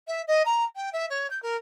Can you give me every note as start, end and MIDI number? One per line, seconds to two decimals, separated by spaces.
0.08 0.22 76
0.28 0.43 75
0.46 0.65 82
0.76 0.90 79
0.93 1.06 76
1.10 1.28 73
1.30 1.41 91
1.43 1.57 70